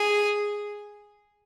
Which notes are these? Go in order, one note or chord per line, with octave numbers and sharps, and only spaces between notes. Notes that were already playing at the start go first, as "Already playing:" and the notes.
Already playing: G#4